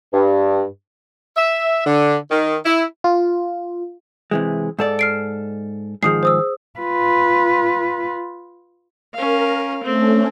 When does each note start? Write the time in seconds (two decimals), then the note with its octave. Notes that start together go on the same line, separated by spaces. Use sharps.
0.13 G2
1.37 E5
1.86 D3
2.30 D#3
2.66 E4
3.04 F4
4.31 C3 E3 G#3
4.79 G#2 A4 D5
4.99 F6 C7 D7
6.03 G#2 D#3 F3 G#4 D#6 C7
6.23 C5 D#6 E6
6.79 F4 B4
9.14 C#4 A#4 F5
9.84 A3 C4 C#4